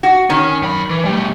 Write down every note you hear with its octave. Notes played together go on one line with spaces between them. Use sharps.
F#4
D#3 C#4
F#2 B5
E3
G3 A3